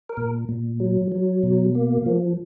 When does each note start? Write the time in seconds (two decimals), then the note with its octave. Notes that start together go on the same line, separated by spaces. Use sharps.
0.09 A#4
0.17 A#2
0.49 A#2
0.80 F#3
1.12 F#3
1.43 B2
1.75 A#3
2.06 F3